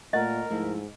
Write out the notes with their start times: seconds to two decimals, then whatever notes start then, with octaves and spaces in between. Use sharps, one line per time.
0.13 A#2 A3 A#4 D#5 F#5
0.50 G#2 F3 A3 E4